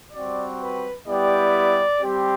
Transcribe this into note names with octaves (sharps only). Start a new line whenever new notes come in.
G3 C4 F#4 D5
B4
G3 B3 E4 G4 D5
G3 C4 G4